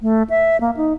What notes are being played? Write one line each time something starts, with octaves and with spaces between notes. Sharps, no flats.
A3
E5
A#3
D#4